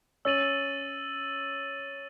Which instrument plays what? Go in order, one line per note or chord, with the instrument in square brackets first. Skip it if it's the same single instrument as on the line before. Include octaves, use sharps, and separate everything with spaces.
[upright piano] C#4 [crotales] E6 A6 D#7 F#7